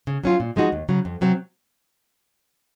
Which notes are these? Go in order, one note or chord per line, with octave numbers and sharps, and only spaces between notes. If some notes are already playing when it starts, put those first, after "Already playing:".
C#3
F#3 C#4 F4
A#2
F3 G#3 D#4 F#4
D#2
C#3 F#3
F2
C3 F#3 C4